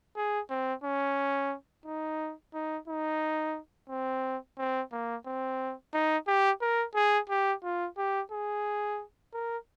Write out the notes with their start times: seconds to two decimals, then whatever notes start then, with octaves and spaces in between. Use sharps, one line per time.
0.16 G#4
0.50 C4
0.84 C#4
1.86 D#4
2.54 D#4
2.88 D#4
3.89 C4
4.58 C4
4.92 A#3
5.26 C4
5.94 D#4
6.27 G4
6.61 A#4
6.95 G#4
7.30 G4
7.64 F4
7.97 G4
8.32 G#4
9.33 A#4